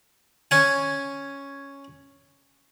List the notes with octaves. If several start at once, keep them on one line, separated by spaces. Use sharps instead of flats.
C#4 G#5